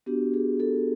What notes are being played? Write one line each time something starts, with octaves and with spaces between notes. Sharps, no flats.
B3 D4 F#4 G4
G#4
A4